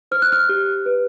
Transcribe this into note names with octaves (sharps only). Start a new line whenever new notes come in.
C5 F6
F#6
F6
G4
B4